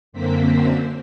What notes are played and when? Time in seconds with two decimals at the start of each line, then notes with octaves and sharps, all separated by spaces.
0.13 F#2 D3 A#3 C4 C5 B6